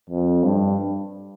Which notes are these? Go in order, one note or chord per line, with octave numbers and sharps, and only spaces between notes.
F2
G2